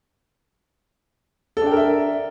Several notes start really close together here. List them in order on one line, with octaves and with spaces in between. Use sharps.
A4 D4 G5 A#4 E5